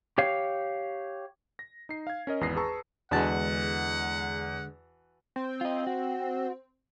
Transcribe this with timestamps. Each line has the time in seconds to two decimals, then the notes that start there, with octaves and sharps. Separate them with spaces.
0.18 G4 C#5 F5
1.59 A#6
1.89 D#4 C7
2.07 F5 G#6
2.27 C#4 A#4 D#5
2.41 G#1 E2 B4 D#6 A#6 C7
2.56 G#4 B4 A5 A#5 C#6 E6
3.11 E2 D3 E3 G#3 F#4 F#5 A5
5.36 C4
5.61 F4 D#5
5.87 F#4